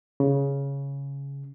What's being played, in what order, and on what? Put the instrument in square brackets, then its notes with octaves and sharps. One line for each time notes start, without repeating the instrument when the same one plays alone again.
[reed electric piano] C#3